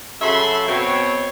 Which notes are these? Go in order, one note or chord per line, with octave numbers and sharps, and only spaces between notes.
C#3 F#3 A4 E5 B5 C6
B2 C4 C#5